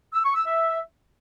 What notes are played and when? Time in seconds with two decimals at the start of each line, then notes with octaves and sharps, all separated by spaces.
0.14 E6
0.24 C#6
0.35 E6
0.45 E5